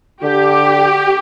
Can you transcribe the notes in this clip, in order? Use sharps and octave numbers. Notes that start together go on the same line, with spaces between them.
D3 G4